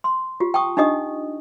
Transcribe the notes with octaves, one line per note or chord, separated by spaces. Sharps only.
C6
F4 G4
G5 A5 C#6 D#6
D4 D#4 G4 D#5 D#6